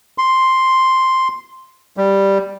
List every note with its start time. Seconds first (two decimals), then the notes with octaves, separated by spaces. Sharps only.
0.18 C6
1.97 G3